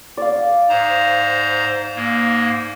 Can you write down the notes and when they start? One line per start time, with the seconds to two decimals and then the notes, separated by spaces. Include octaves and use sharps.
0.17 D5 F5
0.69 G#2 C5 A#5
1.95 G#2 A#3